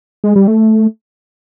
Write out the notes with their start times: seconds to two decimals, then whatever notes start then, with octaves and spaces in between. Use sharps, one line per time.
0.24 G#3
0.36 G3
0.48 A3